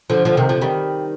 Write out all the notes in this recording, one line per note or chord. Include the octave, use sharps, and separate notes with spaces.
D3 F3
D3 F3
C3 D#3
D3 F3
D#3 G3